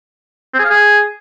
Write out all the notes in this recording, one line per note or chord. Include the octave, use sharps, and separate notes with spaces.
C4
G#4
F5
G#4